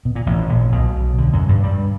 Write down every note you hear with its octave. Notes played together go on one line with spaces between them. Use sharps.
B2
A#2
A1 A2
A#1 A#2
B1 B2
D2 D3
F#2 F#3
G2 G3
G2 G3